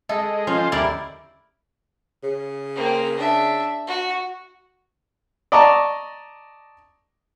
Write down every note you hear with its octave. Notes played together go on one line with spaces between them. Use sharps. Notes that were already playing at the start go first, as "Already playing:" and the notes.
G#3 A4 D#5
F3 C#4 F4 C5
D2 E4 G4 A#4 D5
C#3
A#3 C4
D4 E5
F#4
D5 D#5 A5 A#5 C#6